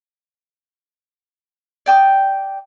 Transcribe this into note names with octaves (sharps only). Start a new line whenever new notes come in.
D5 G5 D#6